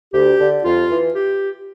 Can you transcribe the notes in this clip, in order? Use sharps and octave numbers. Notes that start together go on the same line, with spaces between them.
D2 G4
D3
F2 F4
E3
G4